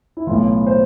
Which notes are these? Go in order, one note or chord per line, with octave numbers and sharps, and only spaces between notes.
E4
B1 A2 E3 F4
C5